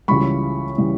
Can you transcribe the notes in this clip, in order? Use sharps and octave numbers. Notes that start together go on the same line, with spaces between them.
C#2 C#3 E3 G3 B5 C#6
C#3 E3 G3